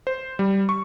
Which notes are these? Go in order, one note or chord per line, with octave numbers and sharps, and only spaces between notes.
C5
G3
C#6